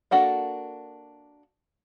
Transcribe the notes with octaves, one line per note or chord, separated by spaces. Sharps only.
A#3 D4 F#4 A4 F5